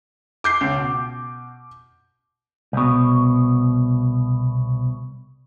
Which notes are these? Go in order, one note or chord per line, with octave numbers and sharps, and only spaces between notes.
D6 G6 C7
C#2
B2
C2 B2